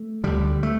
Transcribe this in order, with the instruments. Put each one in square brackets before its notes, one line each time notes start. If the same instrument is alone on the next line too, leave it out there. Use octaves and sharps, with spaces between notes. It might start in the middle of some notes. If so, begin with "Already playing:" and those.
Already playing: [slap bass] A3
D2 D3 G3
A3